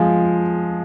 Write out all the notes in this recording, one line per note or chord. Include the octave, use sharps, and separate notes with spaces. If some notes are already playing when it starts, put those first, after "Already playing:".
Already playing: F3 G#3